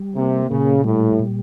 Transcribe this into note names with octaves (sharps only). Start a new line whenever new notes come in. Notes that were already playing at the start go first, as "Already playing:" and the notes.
Already playing: G3
C3 A#3
A#2 C#3
A2 G3
A#2